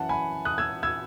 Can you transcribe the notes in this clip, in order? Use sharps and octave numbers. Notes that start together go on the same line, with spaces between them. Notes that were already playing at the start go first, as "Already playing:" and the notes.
Already playing: F#2 E3 F#5 A5
G#5 B5
D#6 F#6
E6 G#6
E6 G#6